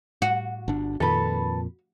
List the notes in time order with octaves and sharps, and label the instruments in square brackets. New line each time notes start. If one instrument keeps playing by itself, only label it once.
[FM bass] A2 [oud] F#4
[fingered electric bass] G1 D4
[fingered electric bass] F2 A#2 [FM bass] D#3 [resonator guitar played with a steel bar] A4 B4